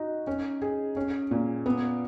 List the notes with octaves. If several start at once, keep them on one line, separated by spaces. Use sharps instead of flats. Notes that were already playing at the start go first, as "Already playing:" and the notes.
Already playing: D#4 F#4
C#4
G#4
C#4
A#2
B3